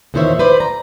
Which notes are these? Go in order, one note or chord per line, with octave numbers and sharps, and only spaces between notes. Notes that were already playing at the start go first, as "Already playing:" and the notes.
E2 A#2 D#3 C5 C#5 E5
B4 C5 D5
A#5